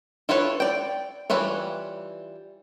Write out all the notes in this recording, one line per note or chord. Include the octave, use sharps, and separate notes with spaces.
E4 F4 A4 B4 C#5
D5 G5
E3 G3 F4 B4 C#5